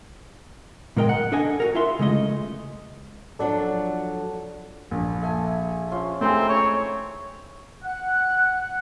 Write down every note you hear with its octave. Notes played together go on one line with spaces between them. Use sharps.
A#2 G#3 A#4 D#5 G5
F#5
D4 A4 D#5 G#5
F#4 A4 A#4
E4 F4 E5 C6
C#3 G#3 A3 D#5
F3 F#3 D4 A4 D5 A5
A#1
A4 E5 G#5
C#4 F4 C5
G3 A3 C4 D#4 E4 G#4
C#4 C#5
F#5 F#6